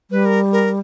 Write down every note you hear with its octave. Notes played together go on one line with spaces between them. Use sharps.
G3 B4
A#4
A#4